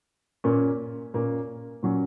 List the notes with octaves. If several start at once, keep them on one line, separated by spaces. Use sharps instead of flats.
A#2 A#3 C#4
A#2 A#3 C#4
A#2 F#3 C#4